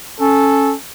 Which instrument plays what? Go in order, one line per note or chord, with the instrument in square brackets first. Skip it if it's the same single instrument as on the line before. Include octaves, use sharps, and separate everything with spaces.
[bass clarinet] C#4 [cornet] A4